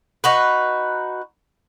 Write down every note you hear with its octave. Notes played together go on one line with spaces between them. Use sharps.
D#4 F#4 B4